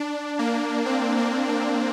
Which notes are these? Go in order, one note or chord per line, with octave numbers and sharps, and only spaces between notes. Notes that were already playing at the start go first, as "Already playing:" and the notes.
Already playing: D4
A#3
C4
A#3
D4